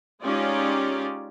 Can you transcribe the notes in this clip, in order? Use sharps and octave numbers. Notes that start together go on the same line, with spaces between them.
G#3 C#4 D#4 F4 G4 D5